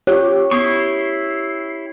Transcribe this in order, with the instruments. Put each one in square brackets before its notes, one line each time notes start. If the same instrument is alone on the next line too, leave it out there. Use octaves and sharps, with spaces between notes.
[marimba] F4 F#6 [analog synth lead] G4 [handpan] C#5
[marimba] B3 D#6 [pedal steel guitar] E4 G4 C#6 [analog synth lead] C7